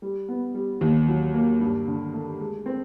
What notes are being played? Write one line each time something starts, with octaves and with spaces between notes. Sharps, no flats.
G3
B3
G3
D#2
F#3
A#3
G2
D3
A3
G#3
C4